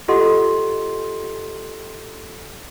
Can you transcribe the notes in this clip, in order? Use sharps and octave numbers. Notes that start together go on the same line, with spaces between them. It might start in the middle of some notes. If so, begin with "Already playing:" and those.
F4 G4 A4 D#5 F#5 C6